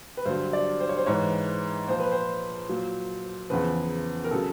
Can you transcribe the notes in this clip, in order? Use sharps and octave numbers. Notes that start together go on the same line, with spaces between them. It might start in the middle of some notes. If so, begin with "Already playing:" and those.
B4
G2 D3 F#3 C5
D5
C5
C#5
C5
G#2 E3 C#5
A#2 F3 C5
B4
C5
A#2 F#3
E2 C#3 F3 B4
A#4
C#3 F#3 A4